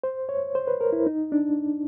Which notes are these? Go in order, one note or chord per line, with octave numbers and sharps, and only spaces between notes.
C5
C#5
C5
B4
A#4
E4
D#4
D4